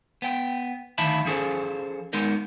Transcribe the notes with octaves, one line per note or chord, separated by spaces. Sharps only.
B3 G5
D2 D#3 F3 E5 A5 B5
F3 C#4 G#4 A4 C5
G#3 B3 D#4 A#4